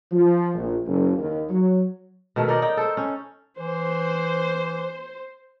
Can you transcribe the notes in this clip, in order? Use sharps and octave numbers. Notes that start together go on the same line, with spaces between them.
F3
A#1
F#1
D#2
F#3
B2 D#3 A3
D#4 A#4 C#5 D5
D#4 G5
A4 C5
C#4
E3 C5